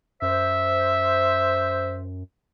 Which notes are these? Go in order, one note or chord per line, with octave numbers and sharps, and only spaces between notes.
F#2 C5 E5